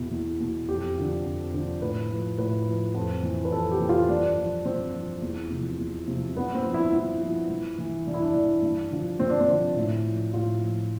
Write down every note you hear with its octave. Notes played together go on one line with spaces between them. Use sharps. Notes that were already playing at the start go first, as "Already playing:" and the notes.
Already playing: E2 B2 E4
E2
B2
F2 G4
D3 F3
F2
D3 F3
A2 B4
F3
A2 B4
F3
F2
E3
B4
F2 A4
G4
E3
F4
G2 D4
F3
G2 C4
F3
E2
C3 F3
E2
C3 F3
G2 B3
C4
F3
E4
G2 E4
F3
G2
E3
G2 D4
E4
D4
E3
G2
D3 F3
G2 C4
D4
C4
D3 F3
A2
F3
A2 F4
F3